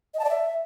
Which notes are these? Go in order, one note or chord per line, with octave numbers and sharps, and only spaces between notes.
D#5
A5
D5
E5